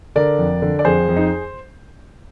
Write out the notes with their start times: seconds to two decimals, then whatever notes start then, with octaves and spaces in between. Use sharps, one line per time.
0.16 D3 A#4 D5
0.39 F2
0.62 D3
0.79 D5
0.85 F2 G#4 C5
1.08 F2
1.17 D#4